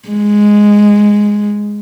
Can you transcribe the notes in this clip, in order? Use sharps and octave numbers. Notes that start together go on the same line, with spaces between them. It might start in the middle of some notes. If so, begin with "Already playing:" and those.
G#3